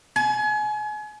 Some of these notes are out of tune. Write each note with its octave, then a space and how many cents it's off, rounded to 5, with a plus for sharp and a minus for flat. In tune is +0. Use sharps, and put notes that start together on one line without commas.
G#5 +35